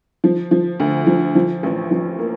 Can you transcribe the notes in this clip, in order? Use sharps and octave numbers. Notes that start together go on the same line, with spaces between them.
F3
F3
D2
F3
F3
A1
F3
A#3